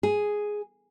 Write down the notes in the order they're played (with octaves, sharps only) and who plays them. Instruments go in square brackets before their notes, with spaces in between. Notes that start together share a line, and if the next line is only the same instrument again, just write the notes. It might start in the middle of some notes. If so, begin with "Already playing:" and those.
[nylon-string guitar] G#4